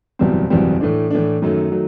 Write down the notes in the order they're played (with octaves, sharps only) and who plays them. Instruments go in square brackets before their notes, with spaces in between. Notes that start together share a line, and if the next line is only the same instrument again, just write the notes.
[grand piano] F#1 E2 B2 G3 C4
F#1 E2 B2 G3 C4
A2 E3 A3 D4
A2 E3 A3 D4
F#2 D#3 F#3 A3
D#3 F#3 A3